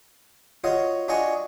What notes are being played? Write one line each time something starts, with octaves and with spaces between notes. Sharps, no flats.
F4 F#4 C#5 D#5 F5
D4 F4 F#4 D#5 G#5 C#6